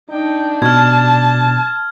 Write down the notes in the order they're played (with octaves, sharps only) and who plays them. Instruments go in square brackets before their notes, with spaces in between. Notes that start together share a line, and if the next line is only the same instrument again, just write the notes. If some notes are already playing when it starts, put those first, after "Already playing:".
[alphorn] D4 [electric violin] D#4 G5
[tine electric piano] B2 [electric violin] A5 [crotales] F6 G#6